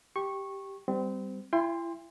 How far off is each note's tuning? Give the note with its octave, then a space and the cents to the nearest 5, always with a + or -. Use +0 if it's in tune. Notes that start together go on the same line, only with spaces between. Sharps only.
G4 +0 C#6 -15
G3 +0 C4 -25
E4 +35 G5 +40 C6 +0